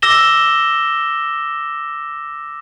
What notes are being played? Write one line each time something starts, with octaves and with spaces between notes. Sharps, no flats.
D6 E6 A#6 E7 G7